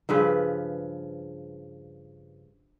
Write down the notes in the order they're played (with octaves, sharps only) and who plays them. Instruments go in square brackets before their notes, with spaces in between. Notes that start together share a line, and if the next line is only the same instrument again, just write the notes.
[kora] G2 C#3 F3 B4